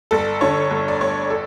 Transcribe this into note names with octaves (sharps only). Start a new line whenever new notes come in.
G1 A4
D3 C#5
G1
D5
G1 C#5
A4